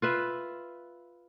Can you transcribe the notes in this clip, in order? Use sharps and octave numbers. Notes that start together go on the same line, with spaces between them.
F4 B4 E5